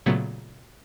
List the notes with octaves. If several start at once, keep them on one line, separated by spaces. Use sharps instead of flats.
A#2 C#3 F#3 A3 B3